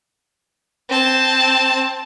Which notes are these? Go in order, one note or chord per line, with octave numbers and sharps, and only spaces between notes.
C4 A5